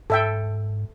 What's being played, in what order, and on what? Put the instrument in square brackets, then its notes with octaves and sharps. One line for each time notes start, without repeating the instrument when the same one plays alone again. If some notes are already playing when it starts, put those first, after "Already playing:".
[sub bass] G#2 [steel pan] A4 E5 G5